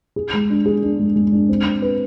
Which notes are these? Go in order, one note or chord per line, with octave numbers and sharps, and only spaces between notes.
G#4
G#3
D4
G#4
D4
G#3
G#3
D4
C4
C4
B4